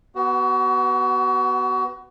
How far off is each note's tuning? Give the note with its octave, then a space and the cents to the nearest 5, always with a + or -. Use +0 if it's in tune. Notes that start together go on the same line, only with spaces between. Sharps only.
B3 +0 F#4 +30